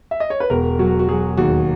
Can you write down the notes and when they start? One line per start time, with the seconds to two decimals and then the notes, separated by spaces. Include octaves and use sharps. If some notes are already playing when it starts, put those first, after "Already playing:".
0.11 E5
0.20 D#5
0.30 C#5
0.40 B4
0.50 E1 A#4
0.79 F#3 F#4
0.99 F#4
1.09 F#3 G#4
1.37 D#2 F#4